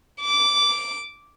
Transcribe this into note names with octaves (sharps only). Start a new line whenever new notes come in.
D6